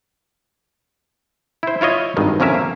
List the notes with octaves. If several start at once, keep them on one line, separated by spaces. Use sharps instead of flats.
E4 C5
E4 F4 C#5 D#5
G#1 G2 D#3
F2 D3 C#4 A#4 E5
A#3